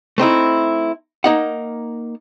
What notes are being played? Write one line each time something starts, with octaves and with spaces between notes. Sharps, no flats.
A3 C4 D#4 E4
A#3 D#4 F#5